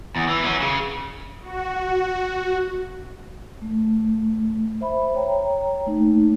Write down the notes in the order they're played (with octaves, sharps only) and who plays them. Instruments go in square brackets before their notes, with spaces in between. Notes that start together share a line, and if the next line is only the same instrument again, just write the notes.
[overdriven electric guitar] E2
E3
F#3 C#4
C#3
[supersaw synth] F#4
[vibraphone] A3
C5 E5 B5
C#5 G5 A#5
A3 A#3 D#4